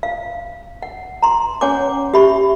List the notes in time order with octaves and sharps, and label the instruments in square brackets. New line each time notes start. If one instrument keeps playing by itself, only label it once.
[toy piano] F5
F#5
A#5 C6
C#4 C#5 F#5 G#5 D6
G4 E5 B5 C#6